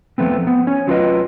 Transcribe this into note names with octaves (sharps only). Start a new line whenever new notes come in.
F3 A3 B3 C4
B3 C4
C#4 C#5
F#3 F4 B4 D#5